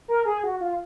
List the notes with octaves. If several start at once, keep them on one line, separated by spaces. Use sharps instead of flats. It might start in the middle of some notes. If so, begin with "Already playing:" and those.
A#4
G#4
F#4
F4